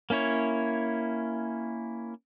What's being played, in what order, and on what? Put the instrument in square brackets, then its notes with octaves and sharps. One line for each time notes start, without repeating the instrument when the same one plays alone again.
[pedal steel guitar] A#3 C#4 E4 C#5